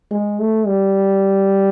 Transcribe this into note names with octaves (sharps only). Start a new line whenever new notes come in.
G#3
A3
G3